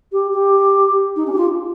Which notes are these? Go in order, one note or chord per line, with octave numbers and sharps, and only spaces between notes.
G4
G4
D#4
C#4
G4
F4